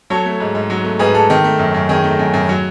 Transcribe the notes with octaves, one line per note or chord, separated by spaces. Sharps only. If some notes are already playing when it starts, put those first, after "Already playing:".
F#3 A4 C#5
A3
G#2
G#2
F#3
A3
G#2 G#4 B4
G#2 A4
D#3
A3
F#2
F#2
D#3 G#4
A3
F#2
F#2
F#3